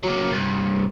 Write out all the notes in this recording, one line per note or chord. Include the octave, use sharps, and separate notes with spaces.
F#3 A#3
C2 G2